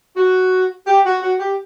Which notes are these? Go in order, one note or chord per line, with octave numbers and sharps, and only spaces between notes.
F#4
G4
F#4
F#4
G4